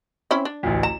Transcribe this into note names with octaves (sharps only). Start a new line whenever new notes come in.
C4 C#4 E4
D4
A1 D2
A#5 E7